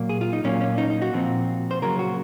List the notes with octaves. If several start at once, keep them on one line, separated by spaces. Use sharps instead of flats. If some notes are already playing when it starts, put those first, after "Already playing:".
Already playing: A#2 F#3 A#3
G#4
F4
D#4
A#2 F#3 A#3 C#4
C#4
D#4
D#4
F#4
A#2 F3 C4
C5
C#3 F#3 A#3 A#4
F#4